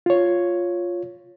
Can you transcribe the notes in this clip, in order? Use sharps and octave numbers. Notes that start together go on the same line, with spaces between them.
F4 C#5